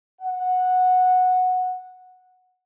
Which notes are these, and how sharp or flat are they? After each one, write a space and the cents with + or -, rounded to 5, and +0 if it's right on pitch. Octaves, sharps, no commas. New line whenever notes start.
F#5 -10